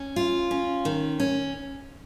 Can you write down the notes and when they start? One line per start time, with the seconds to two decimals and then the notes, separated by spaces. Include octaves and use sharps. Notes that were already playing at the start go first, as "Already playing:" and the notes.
Already playing: C#4
0.16 F4
0.51 C#4
0.85 D#3
1.20 C#4